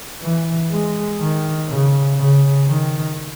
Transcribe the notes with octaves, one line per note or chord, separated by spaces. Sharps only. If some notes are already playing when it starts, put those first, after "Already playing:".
E3
G#3
D#3
C#3
C#3
D#3